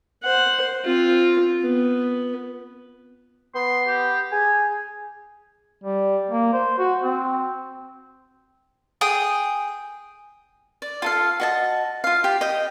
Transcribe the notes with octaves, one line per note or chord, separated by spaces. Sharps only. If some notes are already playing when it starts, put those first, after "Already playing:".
C5 F#5
C4 F4
B3
B3 C6
G4
G#4 G#5
G3
A#3
C5
F#4
C4
G#4 G5 D#6
D5
F4 A4 F5
F#4 D#5 A5
F4 F5
G4
D#5 G5